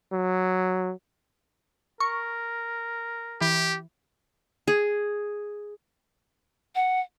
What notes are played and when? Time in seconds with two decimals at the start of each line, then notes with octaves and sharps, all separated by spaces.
0.12 F#3
2.00 A#4 C#6
3.41 E3 G4
4.68 G#4
6.75 F#5